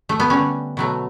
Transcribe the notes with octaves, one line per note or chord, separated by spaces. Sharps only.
A3
B3
D3 G3 C#4
B2 F#3 A3